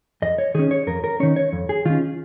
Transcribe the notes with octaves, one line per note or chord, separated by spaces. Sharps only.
F2 D#5
C#5
D#3 C#4 G#4
C#5
F2 A#4
A#4
D#3 C#4 C#5
C#5
F2
G#4
D#3 C#4 F4